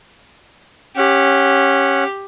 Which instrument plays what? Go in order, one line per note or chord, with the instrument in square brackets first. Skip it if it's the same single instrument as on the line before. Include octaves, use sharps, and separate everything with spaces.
[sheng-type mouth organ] C#4 F#5 [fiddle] G4